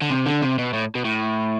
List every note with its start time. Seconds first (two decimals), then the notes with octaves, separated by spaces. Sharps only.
0.02 D3
0.11 C3
0.26 D3
0.42 C3
0.58 B2
0.73 A2
0.95 B2
1.05 A2